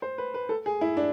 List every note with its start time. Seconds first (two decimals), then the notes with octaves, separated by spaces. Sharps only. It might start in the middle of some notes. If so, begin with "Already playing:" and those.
0.02 C5
0.18 B4
0.34 B4
0.49 A4
0.66 G#4
0.81 E4
0.97 D4